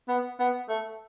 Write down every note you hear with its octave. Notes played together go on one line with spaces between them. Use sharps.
B3
B3
A3